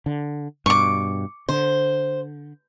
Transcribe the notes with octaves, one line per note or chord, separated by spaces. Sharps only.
D3
G2 B2 C#6 D6
D3 C5